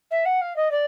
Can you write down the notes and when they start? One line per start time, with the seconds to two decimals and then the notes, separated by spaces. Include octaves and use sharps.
0.11 E5
0.25 F#5
0.41 F5
0.56 D#5
0.71 D5